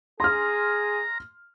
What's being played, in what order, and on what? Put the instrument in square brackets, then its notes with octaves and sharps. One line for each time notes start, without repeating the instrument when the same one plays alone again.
[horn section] G#4 [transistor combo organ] A#5 [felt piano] C6 F6